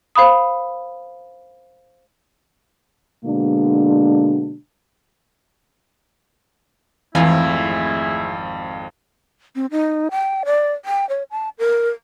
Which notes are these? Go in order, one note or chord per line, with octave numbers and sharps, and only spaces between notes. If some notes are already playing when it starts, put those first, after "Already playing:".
C5 F5 B5 D#6
B2 D3 G#3 A#3 D4
G#1 F2 E3 G#3 A3 E4 F5 G#5
C4
D#4
G5
D5
G5
C#5
A5
A#4